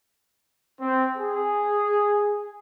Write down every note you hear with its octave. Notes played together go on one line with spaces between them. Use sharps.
C4
G#4